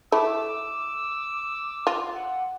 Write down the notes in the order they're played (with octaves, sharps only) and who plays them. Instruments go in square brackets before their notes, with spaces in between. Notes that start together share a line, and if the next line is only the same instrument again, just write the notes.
[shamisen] A3 E4 [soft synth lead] D6 [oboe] E6
[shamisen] F4
[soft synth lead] F#5